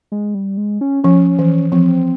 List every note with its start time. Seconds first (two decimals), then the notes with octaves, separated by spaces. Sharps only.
0.12 G#3
0.35 G3
0.57 G#3
0.81 C#4
1.04 F3 C#4
1.39 E3
1.72 F3 C4